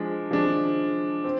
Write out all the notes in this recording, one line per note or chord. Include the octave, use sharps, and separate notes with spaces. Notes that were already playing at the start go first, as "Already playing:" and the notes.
Already playing: F3 G#3 D4
F3 G#3 D4
C4